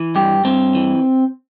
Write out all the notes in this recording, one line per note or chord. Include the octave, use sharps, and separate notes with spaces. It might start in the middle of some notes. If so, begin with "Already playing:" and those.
Already playing: E3
G2 G4
G2 C4
E3